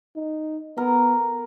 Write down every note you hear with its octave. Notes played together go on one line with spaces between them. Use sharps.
D#4
B3 A#4